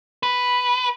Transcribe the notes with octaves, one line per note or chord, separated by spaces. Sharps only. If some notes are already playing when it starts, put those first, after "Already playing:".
B4